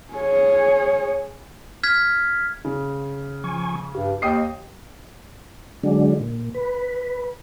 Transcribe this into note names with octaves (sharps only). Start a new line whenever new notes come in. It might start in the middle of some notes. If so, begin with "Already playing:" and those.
G#4 C#5
F6 G#6 B6
C#3
F3 G#5 C#6
G2 G4
D#2 D#5 G5 D#6 C7
D3 F#3 G#3 D4
A#2
B4